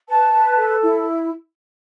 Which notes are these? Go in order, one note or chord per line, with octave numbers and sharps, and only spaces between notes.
B4 A5
B4
A4
E4